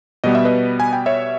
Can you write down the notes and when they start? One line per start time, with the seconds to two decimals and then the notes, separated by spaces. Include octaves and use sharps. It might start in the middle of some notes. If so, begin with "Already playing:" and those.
0.24 B2 G3 B3 D#5
0.35 E5
0.45 B4 D#5
0.80 G#5
0.93 G5
1.06 C#5 E5